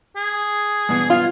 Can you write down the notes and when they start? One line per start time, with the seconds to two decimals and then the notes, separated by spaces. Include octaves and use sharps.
0.16 G#4
0.89 G2 B2 E3
1.10 F4 F5